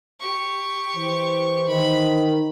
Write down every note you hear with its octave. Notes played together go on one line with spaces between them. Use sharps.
G4 C#6
E3 C5
D#3 B5